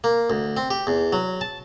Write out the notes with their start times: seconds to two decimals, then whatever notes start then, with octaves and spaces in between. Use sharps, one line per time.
0.04 A#3
0.30 D2
0.57 C4
0.71 G4
0.87 E2
1.13 F#3
1.41 A5